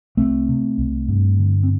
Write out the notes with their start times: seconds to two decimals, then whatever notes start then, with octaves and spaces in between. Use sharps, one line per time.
0.17 C2 A3 C4
0.48 C3
0.78 C2
1.08 G2
1.39 D3
1.63 C4